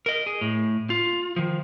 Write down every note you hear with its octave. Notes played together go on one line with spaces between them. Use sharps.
A#4 D#5
G#4
A2
F4
D#3 F3